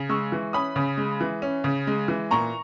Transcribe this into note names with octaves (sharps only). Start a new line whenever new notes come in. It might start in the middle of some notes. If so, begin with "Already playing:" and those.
Already playing: C#3
G#3 C#6 E6
E3
C#4 B5 D#6
C#3
G#3
E3
C#4
C#3
G#3
E3
A#2 A#5 C#6